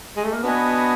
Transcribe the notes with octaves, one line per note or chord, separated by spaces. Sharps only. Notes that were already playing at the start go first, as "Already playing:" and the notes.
G#3
A3
A#3
B3 D4 F#4 B4 D#5 G#5